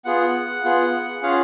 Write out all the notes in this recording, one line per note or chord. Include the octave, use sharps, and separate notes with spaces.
B3 F4 G#4 F#5
B3 F4 G#4
C#4 F4 G#4 F5